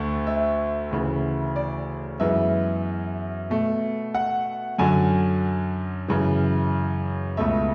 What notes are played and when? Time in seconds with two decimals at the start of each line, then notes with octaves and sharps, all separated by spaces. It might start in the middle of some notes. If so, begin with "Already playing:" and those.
Already playing: D2 D3 A3
0.27 E5
0.91 D2 C#3 E3
1.56 D5
2.20 F#2 E3 G#3 B3 E5
3.50 B2 A3
4.15 F#5
4.79 F#2 D3 F#3 G#5
6.08 F#2 C#3 E3
7.37 C#2 B2 A3 E5